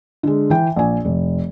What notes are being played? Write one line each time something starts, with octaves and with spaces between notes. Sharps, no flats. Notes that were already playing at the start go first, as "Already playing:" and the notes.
D3 G#3
E3 G5
A#1 G#5
F1